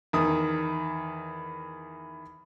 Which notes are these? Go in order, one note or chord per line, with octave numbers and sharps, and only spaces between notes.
E2 D#3 D#6